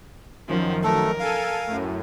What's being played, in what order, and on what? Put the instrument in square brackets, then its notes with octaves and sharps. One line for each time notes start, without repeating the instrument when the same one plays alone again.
[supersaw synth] F#2 D#3 [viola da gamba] F3
[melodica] A3 A4 [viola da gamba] A#4
[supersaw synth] A4 G#5 D#7 [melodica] F5
[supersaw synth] F#2 A2